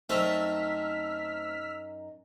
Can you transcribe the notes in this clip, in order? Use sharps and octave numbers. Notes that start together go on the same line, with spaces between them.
F#2 A3 C4 D#4 A4 E6 F6 B6